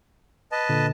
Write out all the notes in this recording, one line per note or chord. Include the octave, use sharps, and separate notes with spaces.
B4 D#5 A5
A#2 D3